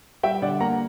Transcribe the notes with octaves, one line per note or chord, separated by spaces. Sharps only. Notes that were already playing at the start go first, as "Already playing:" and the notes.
G3 E5 G5
D3 D5 F#5
A#3 F#5 A#5